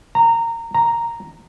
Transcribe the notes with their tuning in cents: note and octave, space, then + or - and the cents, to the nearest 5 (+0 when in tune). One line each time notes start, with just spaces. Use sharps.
A#5 -20
A#5 -5